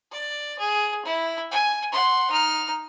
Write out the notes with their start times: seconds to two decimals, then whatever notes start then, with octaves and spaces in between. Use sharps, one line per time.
0.11 D5
0.59 G#4
1.05 E4
1.51 G#5
1.92 F#5 C6
2.31 D#4 F6